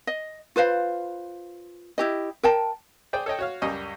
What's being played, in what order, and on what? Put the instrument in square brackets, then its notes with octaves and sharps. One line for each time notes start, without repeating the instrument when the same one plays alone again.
[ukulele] D#5
F4 B4 C5 F5
E4 G4 D#5
A#4 G5 A5
[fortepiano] G#4 C5 D5 G5
A4 C#5 D#5 G5
F#4 C#5 F5
C#2 F#2 G3 D#5 G#5 C#6